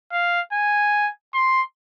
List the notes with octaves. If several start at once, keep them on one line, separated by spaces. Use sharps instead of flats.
F5
G#5
C6